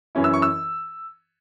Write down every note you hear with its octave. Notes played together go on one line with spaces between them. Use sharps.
F#2 E3 C#4 E4
E6
C#6
E6